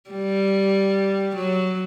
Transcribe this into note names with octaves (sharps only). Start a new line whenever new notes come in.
G3
F#3